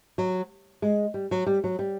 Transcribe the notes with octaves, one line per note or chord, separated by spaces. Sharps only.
F#3
G#3
G3
F#3
G3
F#3
G3